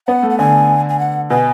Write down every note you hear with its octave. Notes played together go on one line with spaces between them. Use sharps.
B3 F#5
A3
F#5
D3 G#5
G#5
F#5
B2 G#5